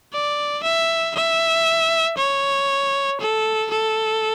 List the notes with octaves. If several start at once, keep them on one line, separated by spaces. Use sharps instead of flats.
D5
E5
E5
C#5
A4
A4